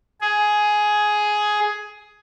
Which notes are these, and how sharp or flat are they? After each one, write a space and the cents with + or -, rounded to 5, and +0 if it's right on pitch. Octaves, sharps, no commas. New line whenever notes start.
G#4 +10